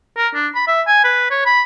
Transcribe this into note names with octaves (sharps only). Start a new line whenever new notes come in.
A#4
D4
B5
E5
G#5
B4
C#5
B5